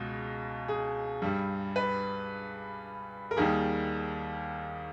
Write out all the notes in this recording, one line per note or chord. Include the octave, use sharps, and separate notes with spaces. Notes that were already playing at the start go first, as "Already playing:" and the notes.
Already playing: C#2 B2 G#3
G#4
G2 G3
B4
A#4
D#2 D#3 G3 G#4